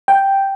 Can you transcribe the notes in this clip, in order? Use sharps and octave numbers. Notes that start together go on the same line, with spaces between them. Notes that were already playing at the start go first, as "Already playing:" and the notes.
G5